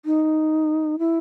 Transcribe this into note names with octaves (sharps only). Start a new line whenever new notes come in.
D#4
E4